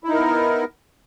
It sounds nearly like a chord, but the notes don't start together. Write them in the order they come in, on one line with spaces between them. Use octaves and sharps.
E4 D#4 A#4 B3